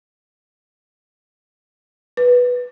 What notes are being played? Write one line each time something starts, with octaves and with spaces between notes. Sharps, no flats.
B4